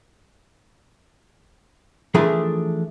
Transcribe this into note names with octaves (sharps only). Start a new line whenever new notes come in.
E3 F3 A3 D4 G#4 A#4